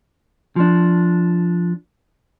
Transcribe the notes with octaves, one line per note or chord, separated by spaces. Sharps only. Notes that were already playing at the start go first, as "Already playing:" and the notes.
F3 D4